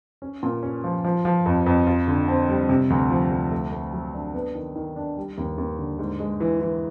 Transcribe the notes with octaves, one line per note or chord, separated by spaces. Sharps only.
C#4
A#2
C#4
F3
F3
F3
F2
F2
F4
D3
C4
G3
C3
D2
F3
D2
A3
A3
F#3
D4
B3
D#3
D#3
D4
G3
D#2
D#2
D3
G#2
G#3
E3
E3